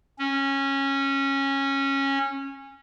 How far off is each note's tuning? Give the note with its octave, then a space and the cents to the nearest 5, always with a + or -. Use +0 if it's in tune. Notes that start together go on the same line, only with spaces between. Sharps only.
C#4 -15